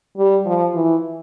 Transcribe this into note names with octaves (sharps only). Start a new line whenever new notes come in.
G3
F3
E3